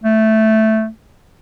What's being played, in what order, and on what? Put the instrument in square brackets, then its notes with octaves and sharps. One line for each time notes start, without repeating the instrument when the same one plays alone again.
[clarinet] A3